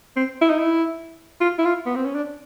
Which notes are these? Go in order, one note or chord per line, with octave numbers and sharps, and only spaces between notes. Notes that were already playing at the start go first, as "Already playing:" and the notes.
C4
E4
D#4
E4
F4
E4
F4
B3
C4
C#4
D4